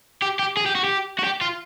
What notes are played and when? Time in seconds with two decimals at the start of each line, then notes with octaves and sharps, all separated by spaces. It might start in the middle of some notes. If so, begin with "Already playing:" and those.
0.22 G4
0.39 G4
0.57 G#4
0.66 G4
0.75 F#4
0.84 G4
1.19 F#4
1.24 G4
1.41 F4